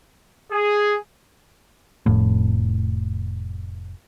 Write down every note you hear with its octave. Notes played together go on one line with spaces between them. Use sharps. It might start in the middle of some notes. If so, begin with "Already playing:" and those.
G#4
F1 A2